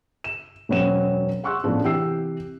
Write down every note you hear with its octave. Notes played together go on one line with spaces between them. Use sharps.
E7
E1 F#2 F#3 C4 C#4 E7
F#5 C6 C#6 E6 F#6
A2 C#3 F3 B3 D4
C3 E3 G4 G5 E6 C7